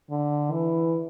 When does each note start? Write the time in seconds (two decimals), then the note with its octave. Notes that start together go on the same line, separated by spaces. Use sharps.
0.11 D3
0.52 E3